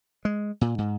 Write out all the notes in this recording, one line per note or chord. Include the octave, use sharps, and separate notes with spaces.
G#3
A#2
G#2